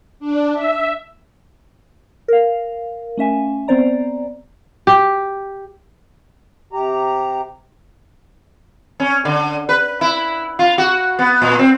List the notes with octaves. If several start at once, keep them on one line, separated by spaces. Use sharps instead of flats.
D4
E5
A#4 F5
A3 C#4 E5 G#5
B3 C4 C5 D5 A#5
G4
C3 G4 A#5
C#4
D3
B4
E4
F4
F#4
B3
A#2
C4